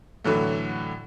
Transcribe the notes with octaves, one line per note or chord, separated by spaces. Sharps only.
A2 D3 E3 F#3 A3